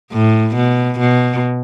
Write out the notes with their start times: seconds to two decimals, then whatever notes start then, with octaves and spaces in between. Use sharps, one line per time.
0.12 A2
0.56 B2
0.99 B2